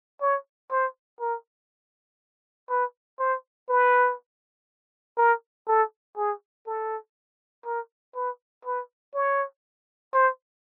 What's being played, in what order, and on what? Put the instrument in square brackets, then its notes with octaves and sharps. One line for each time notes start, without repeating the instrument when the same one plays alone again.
[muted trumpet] C#5
C5
A#4
B4
C5
B4
A#4
A4
G#4
A4
A#4
B4
B4
C#5
C5